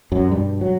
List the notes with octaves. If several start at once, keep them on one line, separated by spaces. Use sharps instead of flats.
F#2 F#3
G2 B2 G3
F#3